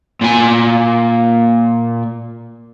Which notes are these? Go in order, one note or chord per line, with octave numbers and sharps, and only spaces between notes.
A#2 G#5